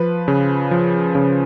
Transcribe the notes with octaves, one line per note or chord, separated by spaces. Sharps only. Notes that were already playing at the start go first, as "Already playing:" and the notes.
Already playing: F3 B4
C#3
F3
C#3